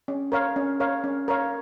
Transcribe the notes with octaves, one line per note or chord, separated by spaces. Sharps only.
C#4
A#4 C#5 F5
C#4
A#4 C#5 F5
C#4
A#4 C#5 F5